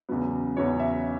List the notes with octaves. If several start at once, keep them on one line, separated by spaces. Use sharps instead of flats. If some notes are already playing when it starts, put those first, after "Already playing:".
E2 C#3 F#3 B3
E2 C#3 F#3 B3 C#5
E5